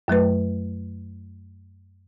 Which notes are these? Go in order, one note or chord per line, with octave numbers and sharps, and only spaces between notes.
F#2 F#3 A3 B4